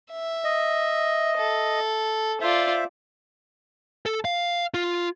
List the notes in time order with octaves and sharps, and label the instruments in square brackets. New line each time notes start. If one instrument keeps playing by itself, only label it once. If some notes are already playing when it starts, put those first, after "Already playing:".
[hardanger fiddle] E5
[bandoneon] D#5
[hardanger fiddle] A4
[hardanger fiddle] F4 D5 [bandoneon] C5 E5
[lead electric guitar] A4
F5
F4